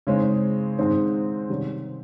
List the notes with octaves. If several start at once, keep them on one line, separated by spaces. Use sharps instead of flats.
C#3 G#3 C4 D#4
G#2 D#3 G#3 C4 D#4
C3 D#3 G3 C#4